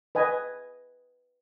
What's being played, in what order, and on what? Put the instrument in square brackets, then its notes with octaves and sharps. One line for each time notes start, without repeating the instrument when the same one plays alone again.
[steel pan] B4 D#5 G#5